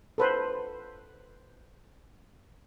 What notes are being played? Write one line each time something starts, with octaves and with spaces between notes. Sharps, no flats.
A4 B4 C5